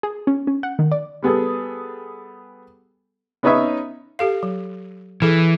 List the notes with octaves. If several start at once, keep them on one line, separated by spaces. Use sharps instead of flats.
G#4
C#4
C#4
F#5
D#3
D5
G3 B3 G#4 A4
B3 C#4 D#4 B4 C#5 E5
G4 A4 F5
F#3
E3 G#4 A4